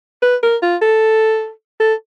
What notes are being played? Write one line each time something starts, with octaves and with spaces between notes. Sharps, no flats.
B4
A#4
F4
A4
A4